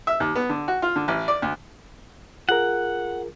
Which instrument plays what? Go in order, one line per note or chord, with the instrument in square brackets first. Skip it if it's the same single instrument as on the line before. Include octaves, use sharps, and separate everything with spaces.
[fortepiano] E5
D#2
B3
D3
F#4
F4
D3
A1
D5
D2
[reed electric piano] F4 G#4 A#4 [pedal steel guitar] F#5